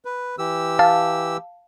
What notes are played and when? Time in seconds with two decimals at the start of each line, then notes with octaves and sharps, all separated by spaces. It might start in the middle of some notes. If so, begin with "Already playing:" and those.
0.05 B4
0.38 E3 G4 E6
0.79 F5 A5